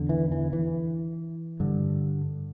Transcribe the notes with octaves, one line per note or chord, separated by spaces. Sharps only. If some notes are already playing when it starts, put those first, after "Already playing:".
Already playing: E2 D3
E3
E3
E3
G2 D3